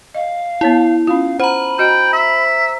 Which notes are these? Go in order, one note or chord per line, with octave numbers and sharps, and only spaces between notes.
D#5 F5
B3 E4 C#5 A5
C#4 F4 F5
C5 F#5 A#5 B5
F#4 D#5 G5
E5